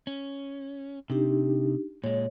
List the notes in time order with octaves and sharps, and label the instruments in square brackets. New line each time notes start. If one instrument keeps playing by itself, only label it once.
[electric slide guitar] C#4
[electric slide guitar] C3 [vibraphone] D4 D#4 G4
[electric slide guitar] A#2 G#3 [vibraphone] C#5